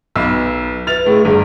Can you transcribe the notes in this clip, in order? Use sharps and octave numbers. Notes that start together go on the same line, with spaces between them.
B1 B3 E6
B4 F6 A6 F7
A2 G#4
G1 G#4